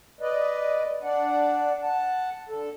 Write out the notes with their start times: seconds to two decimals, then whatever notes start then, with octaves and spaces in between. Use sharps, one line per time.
0.21 B4 D5 D#5
1.03 D4 D5 F#5
1.82 F#5 A5
2.49 D3 A4